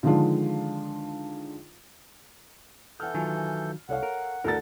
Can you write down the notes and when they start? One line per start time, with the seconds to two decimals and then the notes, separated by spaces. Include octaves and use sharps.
0.03 D3 D#3 F3 G#3 D4 F4
3.00 E3 A4 F#5 F6 G6
3.14 D#3 F#3 F4 G#5
3.89 C2 A4 C#5 F5 F#5
4.03 A#4
4.44 D2 D3 A4 A#4 A#5 A6